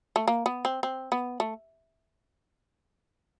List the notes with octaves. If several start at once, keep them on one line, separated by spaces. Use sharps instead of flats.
A3
A#3
B3
C4
C4
B3
A3